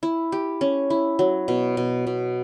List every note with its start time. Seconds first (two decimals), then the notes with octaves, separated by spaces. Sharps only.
0.03 E4
0.32 G4
0.61 C#4
0.90 E4
1.19 F#3
1.48 B2
1.77 B2
2.07 B2